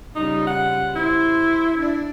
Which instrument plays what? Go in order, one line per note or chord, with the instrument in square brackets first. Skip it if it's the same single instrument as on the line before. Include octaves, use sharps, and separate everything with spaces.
[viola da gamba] C#3 G3 F4 [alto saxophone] D#4
[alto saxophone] F#5
[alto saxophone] E4 [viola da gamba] C5
[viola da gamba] D4 D5